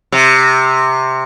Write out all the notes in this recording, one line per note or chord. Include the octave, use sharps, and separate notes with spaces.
C3